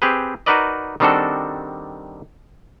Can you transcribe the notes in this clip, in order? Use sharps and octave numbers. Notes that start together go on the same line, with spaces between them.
C4 G4 G#4 B4
D#4 F#4 A#4 B4 D5 D#5
D#3 G3 C4 D4 F#4 A4